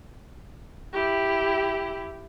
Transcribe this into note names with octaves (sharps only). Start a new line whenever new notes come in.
E4 G4